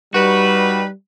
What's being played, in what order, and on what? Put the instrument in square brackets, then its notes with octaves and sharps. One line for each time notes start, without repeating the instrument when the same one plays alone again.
[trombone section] G3 [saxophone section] D#4 B4 [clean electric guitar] F#4